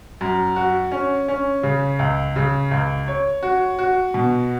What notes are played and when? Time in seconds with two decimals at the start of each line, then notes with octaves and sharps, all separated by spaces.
0.21 F#2
0.56 F#4
0.91 C#4
1.28 C#4
1.63 C#3
1.99 C#2
2.36 C#3
2.71 C#2
3.08 C#5
3.43 F#4
3.79 F#4
4.14 B2